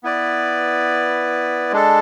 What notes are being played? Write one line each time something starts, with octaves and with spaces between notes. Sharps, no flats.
B3 E4 B4 D5
G#3 D4 A4